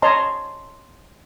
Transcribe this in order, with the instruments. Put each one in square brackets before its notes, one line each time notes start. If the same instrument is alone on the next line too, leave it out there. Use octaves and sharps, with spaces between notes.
[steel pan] C#5 D#5 A5 A#5 C6